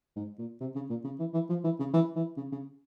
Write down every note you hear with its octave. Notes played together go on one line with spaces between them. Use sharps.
G#2
A#2
C3
C#3
A#2
C#3
E3
E3
F3
E3
C#3
E3
E3
C#3
C#3